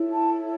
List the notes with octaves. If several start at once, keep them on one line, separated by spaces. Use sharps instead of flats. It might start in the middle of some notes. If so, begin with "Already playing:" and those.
Already playing: E4 A4 C#5
A5